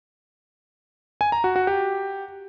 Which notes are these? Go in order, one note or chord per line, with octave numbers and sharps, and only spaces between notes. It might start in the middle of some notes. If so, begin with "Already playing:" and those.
G#5
A#5
F#4
F#4
G4